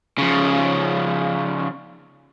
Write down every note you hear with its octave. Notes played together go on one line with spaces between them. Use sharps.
C#3 F3